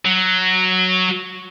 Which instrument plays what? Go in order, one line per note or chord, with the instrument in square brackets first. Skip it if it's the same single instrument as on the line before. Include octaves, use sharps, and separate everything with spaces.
[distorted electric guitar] F#3